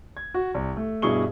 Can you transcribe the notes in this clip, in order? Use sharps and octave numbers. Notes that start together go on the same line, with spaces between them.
G#6
F#4
C2
A3
G2 B2 E4 G#4 C#6 G7